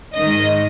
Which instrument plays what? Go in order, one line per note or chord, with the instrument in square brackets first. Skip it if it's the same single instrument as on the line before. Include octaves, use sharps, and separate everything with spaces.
[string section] G#2 D#3 G#3 D#5